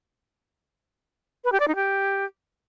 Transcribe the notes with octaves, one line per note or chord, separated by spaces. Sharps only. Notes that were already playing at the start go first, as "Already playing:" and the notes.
B4
G4
D5
D#4
G4